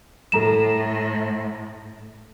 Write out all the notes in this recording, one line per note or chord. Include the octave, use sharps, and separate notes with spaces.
A2 A4 A#5 E7